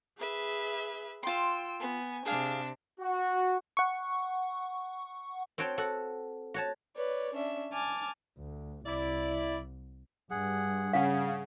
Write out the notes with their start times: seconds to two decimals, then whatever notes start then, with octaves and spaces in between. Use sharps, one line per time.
0.18 G#4 B4 E5
1.23 F4 G5 C6 E6
1.80 B3 G#5
2.26 C3 D4 G#4 F5
3.00 F#4
3.77 F#5 C#6
5.58 C4 F#4 C#5 G5 A5
5.78 F#4 A4 F#5
6.54 F#4 C#5 A5
6.96 B4 C#5 D5
7.34 C#4 D4 E5
7.72 G#5 A5 D6 F6
8.38 D2
8.86 C2 E4 D5
10.30 G2 G#4 F#5
10.93 C#3 G#4 F5 F#5